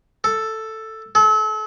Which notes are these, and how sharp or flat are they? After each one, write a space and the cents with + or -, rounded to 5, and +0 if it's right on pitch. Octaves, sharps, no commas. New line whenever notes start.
A4 +5
A4 -35